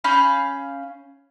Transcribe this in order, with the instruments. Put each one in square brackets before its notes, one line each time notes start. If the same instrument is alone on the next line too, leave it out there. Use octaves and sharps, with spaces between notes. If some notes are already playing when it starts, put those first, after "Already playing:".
[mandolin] C#4 F5 B5 G6